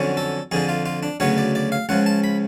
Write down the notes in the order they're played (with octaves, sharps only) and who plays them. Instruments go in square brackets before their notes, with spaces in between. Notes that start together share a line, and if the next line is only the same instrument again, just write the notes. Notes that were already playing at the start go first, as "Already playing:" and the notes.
Already playing: [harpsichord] F2 D3 F#3 C#4
A4
F2 D3 F3 G#4
F4
F4
D4
D2 C#3 F#3 B3 C#5
D5
D5
F5
C#2 C#3 F3 F#5
A5
B5